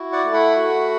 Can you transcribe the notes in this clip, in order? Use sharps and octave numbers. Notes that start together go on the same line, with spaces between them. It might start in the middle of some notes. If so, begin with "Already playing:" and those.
Already playing: E4 F#4
D5 F#5
A3
F#5 B5
F#4